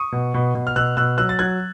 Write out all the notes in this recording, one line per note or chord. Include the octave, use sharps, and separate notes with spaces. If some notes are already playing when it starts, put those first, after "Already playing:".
Already playing: C#6 D#6
B2
B2
B2
F6
B2 E6 F#6
B2 E6 F#6
F#3 E6 F#6
A6
F#3 F#6 G#6